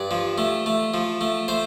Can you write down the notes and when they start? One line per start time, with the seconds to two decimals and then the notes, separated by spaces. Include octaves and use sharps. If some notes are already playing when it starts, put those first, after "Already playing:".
Already playing: G2 D5
0.11 F3
0.38 A3
0.66 A3
0.94 F3
1.21 A3
1.48 A3 C5